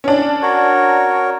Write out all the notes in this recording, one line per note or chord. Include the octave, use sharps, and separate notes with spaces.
C#4 D4
F#4 A#4 C#5